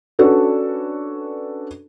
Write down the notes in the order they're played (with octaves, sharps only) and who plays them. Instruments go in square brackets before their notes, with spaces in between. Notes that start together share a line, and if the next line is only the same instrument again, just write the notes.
[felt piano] C#4 D4 F#4 A4 B4